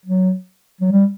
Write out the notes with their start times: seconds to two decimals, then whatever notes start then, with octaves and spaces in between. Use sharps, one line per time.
0.06 F#3
0.81 F#3
0.92 G3